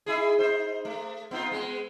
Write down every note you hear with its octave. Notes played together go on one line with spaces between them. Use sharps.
D#4 E4 G#4
D#4 C5
A3
B3 D#4 F4
G#3 B3